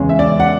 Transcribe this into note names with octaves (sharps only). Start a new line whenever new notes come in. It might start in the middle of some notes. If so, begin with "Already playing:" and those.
Already playing: E2 C#3 G#3 C#4
E5
D5
F#5